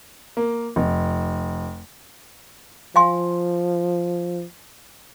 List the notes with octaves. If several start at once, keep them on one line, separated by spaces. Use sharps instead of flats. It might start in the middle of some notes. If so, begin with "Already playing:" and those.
A#3
F1
F3 F5 G#5 C6